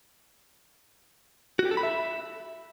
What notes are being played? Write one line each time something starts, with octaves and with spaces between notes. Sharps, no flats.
F#4
G4
A4
B5
E5